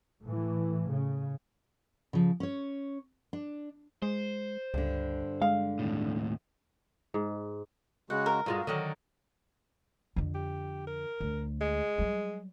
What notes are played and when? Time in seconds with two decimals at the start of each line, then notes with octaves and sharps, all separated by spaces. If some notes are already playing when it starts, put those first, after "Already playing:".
0.23 A2 E3
0.90 C#3
2.13 C#3 F3
2.40 C#4 C#5
3.33 D4
4.02 G#3 C5
4.74 C#2 G2 D3
5.42 G#3 F5
5.79 D#2 A2
7.14 G#2
8.10 C#3 G#3 F#4 F#5
8.26 A#4
8.46 G2 G#3 F4 F#4
8.67 D3 D#3 F#3
10.16 F2 D3
10.35 G4
10.87 A#4
11.20 D2
11.61 G#3
11.98 F#3 G3